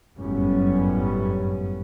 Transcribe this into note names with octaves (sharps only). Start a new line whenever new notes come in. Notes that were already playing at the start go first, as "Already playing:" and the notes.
G1 F#2 A2 G3 B3 C#4